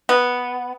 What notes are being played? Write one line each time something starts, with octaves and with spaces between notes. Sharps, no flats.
B3